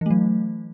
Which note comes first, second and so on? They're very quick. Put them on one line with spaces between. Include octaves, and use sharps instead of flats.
E3 A3 F#3